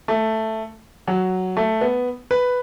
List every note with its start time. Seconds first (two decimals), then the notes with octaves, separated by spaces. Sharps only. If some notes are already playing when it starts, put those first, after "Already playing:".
0.08 A3
1.08 F#3
1.57 A3
1.81 B3
2.31 B4